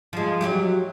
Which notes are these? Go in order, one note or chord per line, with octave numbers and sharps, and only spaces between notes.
F3 G#3
F#3 E4 G4